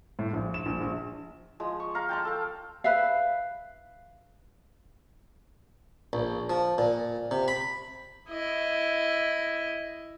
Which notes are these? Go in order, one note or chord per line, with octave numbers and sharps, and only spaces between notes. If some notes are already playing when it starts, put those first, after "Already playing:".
A2
A#1
E7
A#1
A#1
F3 G#3
C#6
F5 A#5 C6
G5 A5 D6
A4 F5
B4 E5 F5
A#1
F3
A#2
C3
B5
E4 D#5